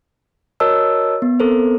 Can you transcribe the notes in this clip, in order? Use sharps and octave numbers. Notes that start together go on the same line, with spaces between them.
F#4 A#4 C#5 D#5 A5 E6
B3
B3 C4 A4 A#4 C5